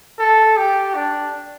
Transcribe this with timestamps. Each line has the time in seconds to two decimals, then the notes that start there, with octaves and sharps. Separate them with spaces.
0.19 A4
0.57 G4
0.95 D4